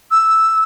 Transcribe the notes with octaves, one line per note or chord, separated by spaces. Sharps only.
E6